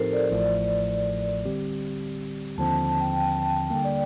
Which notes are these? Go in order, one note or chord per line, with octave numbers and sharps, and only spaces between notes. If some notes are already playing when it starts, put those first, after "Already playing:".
Already playing: A2 F3 C4 D#4 G4 A4 A#4 C5
D5
A1 A2 F3 A3 D5
D3 G3 C4 G4
D#2 D3 F3 C4 A5
A5
A5
G5
G5
A5
A5
D3 G3 A#3 G5
D5